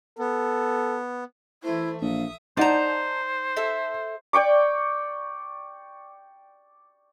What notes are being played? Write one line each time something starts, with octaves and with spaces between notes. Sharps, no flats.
B3 A4
E3 A3 E4 C5
A#1 E5 F5 D#6
D#4 C5 D5 F#5 A5 A#5
A4 E5
D5 G5 C#6 D6